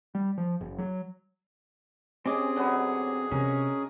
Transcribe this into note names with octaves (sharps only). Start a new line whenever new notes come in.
G3
F3
F#1
F#3
C4 C#4 G4 G#4 D#5 D6
D3 F#3 B3
C3 C#4 A#4 G#5